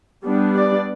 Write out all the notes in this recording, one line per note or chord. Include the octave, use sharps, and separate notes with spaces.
G3 B3 D4
D5